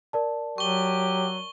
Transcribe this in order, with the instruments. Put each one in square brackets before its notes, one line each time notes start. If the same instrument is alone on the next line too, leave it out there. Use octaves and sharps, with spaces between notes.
[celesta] A#4 D5 A5
[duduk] F#3 [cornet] G4 [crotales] C#6 G7